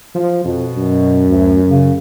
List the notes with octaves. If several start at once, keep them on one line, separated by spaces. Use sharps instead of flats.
F3
F2 B2
F#2
D2
C#3